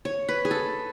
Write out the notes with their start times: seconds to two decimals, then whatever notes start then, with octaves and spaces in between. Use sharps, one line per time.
0.05 C#5
0.29 B4
0.45 G#4
0.51 A4